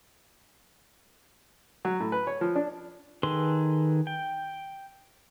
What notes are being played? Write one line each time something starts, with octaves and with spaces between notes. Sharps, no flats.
F#3
A2
B4
C#5
F3
D4
D#3 G#4 A4 B4 C6
G5